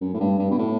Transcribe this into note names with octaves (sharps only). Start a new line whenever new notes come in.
F#2
A2
G2
G2
B2
A2